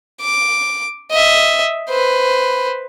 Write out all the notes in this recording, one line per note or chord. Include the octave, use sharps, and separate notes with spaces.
D6
D#5 E5
B4 C5